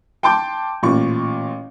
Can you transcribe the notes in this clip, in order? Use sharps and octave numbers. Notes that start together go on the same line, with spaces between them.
G5 A5 C6 D6 G6
A1 A#2 C#6